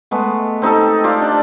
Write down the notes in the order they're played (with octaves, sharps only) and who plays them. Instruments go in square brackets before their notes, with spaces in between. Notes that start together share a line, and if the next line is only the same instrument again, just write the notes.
[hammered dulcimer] G#3 A3 B3
C4 D#4 G4 A4
F4 G4 C5 D5
D4